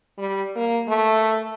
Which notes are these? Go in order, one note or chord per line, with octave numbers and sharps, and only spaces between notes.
G3
A#3
A3